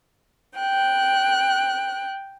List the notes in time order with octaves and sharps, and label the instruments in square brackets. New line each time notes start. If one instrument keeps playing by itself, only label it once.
[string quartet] G5 F#6